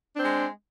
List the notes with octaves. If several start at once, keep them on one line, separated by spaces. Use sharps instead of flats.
G#3 C4 D4